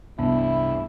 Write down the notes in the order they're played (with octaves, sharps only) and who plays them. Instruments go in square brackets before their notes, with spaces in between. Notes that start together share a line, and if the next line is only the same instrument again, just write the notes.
[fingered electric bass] C2 G2 [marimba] B3 [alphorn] E4